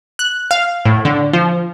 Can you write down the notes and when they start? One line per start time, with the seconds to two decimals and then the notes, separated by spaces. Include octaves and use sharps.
0.19 F#6
0.51 F5
0.85 A2
1.05 D3
1.33 F3